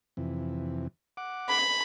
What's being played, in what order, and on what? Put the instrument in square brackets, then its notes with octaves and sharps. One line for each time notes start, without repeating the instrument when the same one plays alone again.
[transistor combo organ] F2 C3 E3
F#5 D6
[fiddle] B5